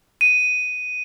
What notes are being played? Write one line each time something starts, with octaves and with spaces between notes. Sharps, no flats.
D#7